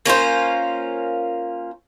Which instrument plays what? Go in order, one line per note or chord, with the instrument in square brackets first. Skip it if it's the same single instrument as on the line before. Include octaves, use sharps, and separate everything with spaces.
[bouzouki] A#3 C#4 F4 C5